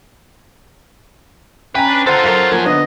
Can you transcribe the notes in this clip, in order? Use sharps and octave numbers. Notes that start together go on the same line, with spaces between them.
C#4 B4 G5 G#5 A#5
D4
F4 A4 C5 F#5
F#2 F#3 A4 A#4 F#5
F3 A#3 G#5
D3 B3 D#5